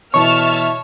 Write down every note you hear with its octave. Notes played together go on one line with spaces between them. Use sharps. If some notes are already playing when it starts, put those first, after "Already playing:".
B2 E3 C#5 E5 A5 C#6 F6